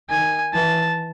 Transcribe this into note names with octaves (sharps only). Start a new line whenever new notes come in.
D#3 G#5
E3 A5